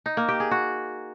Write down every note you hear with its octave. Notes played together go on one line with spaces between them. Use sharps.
D#4
A#3
G4
G#4
F#4